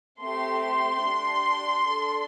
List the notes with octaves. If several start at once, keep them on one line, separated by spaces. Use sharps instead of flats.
A3 C4 G4 C6
D4 G4
D4 A4